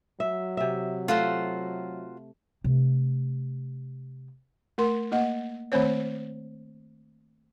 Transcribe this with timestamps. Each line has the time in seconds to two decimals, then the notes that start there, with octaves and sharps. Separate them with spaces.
0.20 F#3 E5
0.57 C3 E5
1.08 A3 F4 F#4 C5
2.64 C3 A3
4.78 A3 A#4 C6
5.12 A#3 D#5 F#5
5.72 D#3 A3 C4 C5 C#5